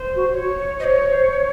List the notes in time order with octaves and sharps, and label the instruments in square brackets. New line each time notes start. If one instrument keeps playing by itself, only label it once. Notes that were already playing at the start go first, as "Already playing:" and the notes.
Already playing: [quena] C5
[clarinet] F#4
[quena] C#5
[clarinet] C5 [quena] D#5
[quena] C#5
[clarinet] C5